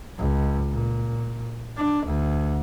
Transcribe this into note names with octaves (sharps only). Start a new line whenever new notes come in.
C#2
A#2
D4
D2